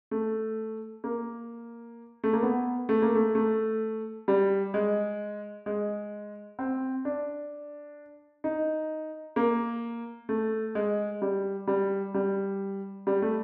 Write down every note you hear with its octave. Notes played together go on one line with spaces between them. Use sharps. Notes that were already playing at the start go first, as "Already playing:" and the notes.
A3
A#3
A3
A#3
B3
A3
A#3
A3
A3
G3
G#3
G#3
C4
D4
D#4
A#3
A3
G#3
G3
G3
G3
G3
A3